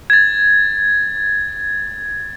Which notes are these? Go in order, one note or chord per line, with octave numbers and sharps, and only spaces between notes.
G#6 A6